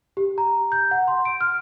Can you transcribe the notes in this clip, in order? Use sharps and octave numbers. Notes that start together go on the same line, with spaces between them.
G4
A#5
G6
F#5
C6
D7
F6